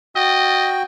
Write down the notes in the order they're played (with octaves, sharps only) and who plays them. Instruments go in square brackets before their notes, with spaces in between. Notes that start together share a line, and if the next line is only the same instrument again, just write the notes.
[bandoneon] F#4 G5 [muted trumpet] D#5